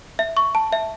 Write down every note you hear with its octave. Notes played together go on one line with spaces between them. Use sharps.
E5
C#6
A5
E5